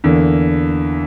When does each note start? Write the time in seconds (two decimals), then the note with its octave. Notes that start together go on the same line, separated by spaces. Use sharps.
0.04 E2 D3 A#3